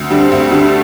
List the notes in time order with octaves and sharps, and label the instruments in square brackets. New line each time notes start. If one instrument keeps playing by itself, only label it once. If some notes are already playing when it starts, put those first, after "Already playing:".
Already playing: [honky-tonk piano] D2 [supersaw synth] C4
[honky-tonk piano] D3 G3 D4
[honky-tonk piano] D2 [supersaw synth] A3
[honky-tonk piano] D3 G3 D4